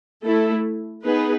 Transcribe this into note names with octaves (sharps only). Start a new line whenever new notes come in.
A3 E4 A4
B3 D#4 G#4 B4